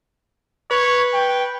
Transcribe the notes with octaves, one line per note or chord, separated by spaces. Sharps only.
B4 C#5
G5